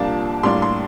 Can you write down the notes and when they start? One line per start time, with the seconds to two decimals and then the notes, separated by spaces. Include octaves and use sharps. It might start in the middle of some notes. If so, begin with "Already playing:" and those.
Already playing: C2 A#2 F3 A#3 D4 A5
0.43 A2 G3 A#3 D4 C6
0.62 C6